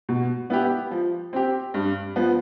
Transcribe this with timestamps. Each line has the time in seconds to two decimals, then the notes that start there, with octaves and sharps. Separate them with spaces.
0.09 B2
0.50 B3 E4 G4
0.91 F3
1.33 C4 G4
1.74 G2
2.16 F3 B3